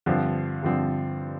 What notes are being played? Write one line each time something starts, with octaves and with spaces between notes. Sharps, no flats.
G2 D3 F3 C4
G2 D3 F3 C4